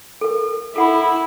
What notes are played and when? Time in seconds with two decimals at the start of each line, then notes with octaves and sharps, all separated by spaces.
0.21 A4 A#4
0.76 E4 A4 F#5 B5